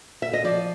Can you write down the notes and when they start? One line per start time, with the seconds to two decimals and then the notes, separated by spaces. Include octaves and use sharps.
0.22 E5
0.33 D#5
0.44 F3 D5